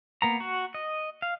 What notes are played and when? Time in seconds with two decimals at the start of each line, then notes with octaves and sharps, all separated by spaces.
0.22 A#3 B3 A#5
0.40 F#4
0.74 D#5
1.22 F5